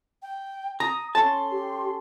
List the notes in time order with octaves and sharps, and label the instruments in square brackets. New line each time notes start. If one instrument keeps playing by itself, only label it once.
[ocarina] G5
[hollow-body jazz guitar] A#5 [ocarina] D#6
[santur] C#4 A4 [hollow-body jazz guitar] A5 [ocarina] C6
[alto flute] G4